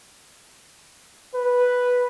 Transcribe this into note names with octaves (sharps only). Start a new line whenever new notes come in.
B4